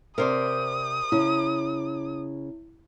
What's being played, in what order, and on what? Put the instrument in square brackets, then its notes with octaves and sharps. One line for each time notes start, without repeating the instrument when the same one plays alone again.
[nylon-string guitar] C3 [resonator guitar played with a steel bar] A#4 C5 D5 [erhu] D#6
[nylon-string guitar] C#3 [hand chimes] E4